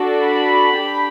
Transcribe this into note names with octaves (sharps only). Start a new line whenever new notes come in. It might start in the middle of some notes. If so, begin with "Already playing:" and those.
Already playing: D4 F#4 A4
B5
D4 G4